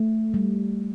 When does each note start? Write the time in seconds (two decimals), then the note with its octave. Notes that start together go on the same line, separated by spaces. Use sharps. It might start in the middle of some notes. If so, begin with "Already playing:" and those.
Already playing: A3
0.34 G3